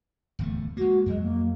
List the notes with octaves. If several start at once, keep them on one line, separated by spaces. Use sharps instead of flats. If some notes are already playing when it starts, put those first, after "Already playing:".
D1 E2 A3
G#3 A#3 F#4
F2 F#3 G#3
A#3